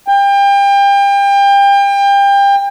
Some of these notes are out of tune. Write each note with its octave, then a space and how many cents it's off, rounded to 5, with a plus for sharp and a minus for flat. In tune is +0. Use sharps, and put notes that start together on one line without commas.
G5 +30